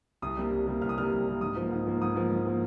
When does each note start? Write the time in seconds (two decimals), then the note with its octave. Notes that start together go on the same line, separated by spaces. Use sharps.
0.22 C2 D#6
0.37 C3 G3 A#3
0.51 C2
0.67 C3 G3 A#3
0.81 C2 F6
0.89 D#6
0.97 C3 G3 A#3 F6
1.11 C2
1.27 C3 G3 A#3
1.41 G#2 D#6
1.56 F3 A#3
1.71 G#2
1.86 F3 A#3
2.02 G#2 D#6
2.16 F3 A#3
2.31 G#2
2.46 F3 A#3